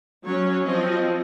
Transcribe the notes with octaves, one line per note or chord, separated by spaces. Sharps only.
F#3 C#4 C#5
F3 C4 D#5